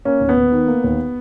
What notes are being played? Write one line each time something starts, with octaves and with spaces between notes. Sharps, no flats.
A#3 C#4
D#2
B3
D#2
D#3
A#3
D#2